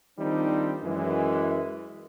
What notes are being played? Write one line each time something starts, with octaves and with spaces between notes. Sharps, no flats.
D#3 F3 G3 C4 D4 D#4
F#2 E3 G#3